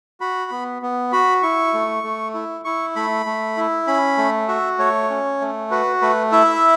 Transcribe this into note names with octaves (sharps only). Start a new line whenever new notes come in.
F#4 B5
B3
B3
F#4 B5
E4 C#6
A3
A3
E4
E4 C#6
A3 B5
A3
E4
C#4 B5
A3
F#4 E5
A3 C#5
C#4
A3
F#4 B4
A3 B4
E4 E5